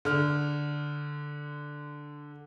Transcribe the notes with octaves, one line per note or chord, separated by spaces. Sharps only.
D3 F6